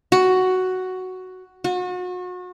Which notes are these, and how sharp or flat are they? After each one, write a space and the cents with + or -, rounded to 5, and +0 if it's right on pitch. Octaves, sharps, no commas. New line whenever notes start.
F#4 +5
F#4 -35